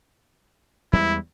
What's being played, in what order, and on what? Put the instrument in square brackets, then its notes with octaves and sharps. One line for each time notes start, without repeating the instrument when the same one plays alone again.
[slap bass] E2 G3 G#3 [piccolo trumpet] E4